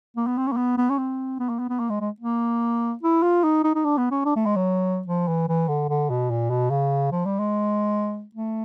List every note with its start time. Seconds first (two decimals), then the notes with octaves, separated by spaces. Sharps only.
0.17 A#3
0.27 B3
0.37 C4
0.47 C#4
0.53 A#3
0.57 B3
0.78 B3
0.90 C#4
0.98 C4
1.40 B3
1.49 A#3
1.59 B3
1.70 B3
1.79 A#3
1.90 G#3
2.01 G#3
2.20 A#3
3.03 E4
3.23 F4
3.44 D#4
3.64 D#4
3.75 D#4
3.85 D4
3.98 B3
4.11 C#4
4.25 D4
4.36 A3
4.46 G#3
4.56 F#3
5.07 F3
5.28 E3
5.49 E3
5.68 D3
5.89 D3
6.10 B2
6.30 A#2
6.50 B2
6.70 C#3
7.12 F3
7.26 G3
7.39 G#3
8.35 A3